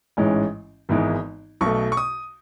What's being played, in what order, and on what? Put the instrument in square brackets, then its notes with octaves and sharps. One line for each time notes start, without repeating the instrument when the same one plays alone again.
[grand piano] A1 G#2 E3 G#3 C#4
G#1 G#2 E3 G#3 B3
B1 B2 A3 C#6
C#6
D#6